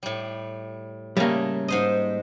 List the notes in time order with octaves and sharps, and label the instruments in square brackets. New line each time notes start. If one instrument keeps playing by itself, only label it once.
[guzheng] A2 G3
[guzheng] C#3 A3 [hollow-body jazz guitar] G3 A#3
[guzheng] G#2 C5 D#5